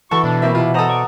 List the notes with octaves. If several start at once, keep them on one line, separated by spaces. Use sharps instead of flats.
E3 F#4 A4 C#6
B2 D4
A#3 C4 E5
C3 E4 F4
E2 B3 A4 C5 D#5 F#5 A#5 D#6
D5 C#6